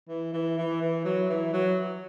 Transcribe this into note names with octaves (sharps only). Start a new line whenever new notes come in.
E3
E3
E3
E3
F#3
E3
F#3